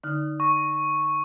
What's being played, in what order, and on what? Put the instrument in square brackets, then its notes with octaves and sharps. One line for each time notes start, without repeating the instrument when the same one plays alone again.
[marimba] D3 D#4 F6
[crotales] C#6